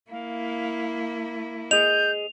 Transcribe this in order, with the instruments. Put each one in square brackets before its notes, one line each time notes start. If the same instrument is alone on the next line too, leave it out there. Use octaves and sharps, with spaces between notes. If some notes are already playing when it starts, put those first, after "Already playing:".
[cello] A#3 E4 [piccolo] F5
[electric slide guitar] G#4 D#5 [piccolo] G6 [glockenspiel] F7